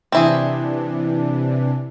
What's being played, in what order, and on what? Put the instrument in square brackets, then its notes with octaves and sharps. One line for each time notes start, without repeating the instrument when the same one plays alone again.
[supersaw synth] C3 E3 D4 [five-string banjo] C4 E4 G#4